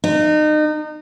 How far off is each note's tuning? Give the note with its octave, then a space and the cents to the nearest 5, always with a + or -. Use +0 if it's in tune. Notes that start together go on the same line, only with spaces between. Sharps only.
D#4 -30